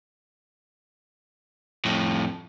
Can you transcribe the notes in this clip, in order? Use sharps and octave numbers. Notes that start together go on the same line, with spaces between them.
F2 A2